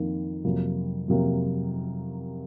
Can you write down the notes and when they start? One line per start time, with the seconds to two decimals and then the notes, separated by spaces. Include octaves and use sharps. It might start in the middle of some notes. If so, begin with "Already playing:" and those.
Already playing: F2 D#3 A#3
0.44 F2 C3 F#3 A#3
1.08 F2 C3 F#3 A#3